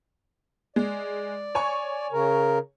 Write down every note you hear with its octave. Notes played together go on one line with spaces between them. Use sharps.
G#3 D5
C#5 G#5 C#6
C#3 A#4